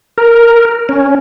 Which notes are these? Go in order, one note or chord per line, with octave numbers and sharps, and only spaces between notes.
A#4
C#4